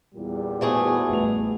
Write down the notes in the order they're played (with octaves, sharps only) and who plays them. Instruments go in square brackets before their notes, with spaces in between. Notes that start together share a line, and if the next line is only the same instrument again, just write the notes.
[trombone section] E2 A#2 G3
[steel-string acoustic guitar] E3 A3 G#4 [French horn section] B3 F#4 [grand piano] C5
[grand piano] A1 F7